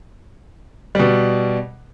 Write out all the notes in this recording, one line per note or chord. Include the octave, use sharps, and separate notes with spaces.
B2 G3